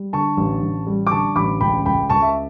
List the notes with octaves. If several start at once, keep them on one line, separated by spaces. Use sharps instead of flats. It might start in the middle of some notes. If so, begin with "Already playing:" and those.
Already playing: G3
D3 A5 C#6
A1
A1
G3
D6
D3 A5 C#6
A1 B5 D6
C#2 G5 B5
C#2 G5 B5
C#2 A5 C#6
E5